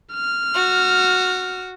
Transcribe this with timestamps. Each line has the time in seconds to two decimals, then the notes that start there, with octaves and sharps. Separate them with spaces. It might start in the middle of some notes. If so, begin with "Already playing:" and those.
0.14 F6
0.55 F#4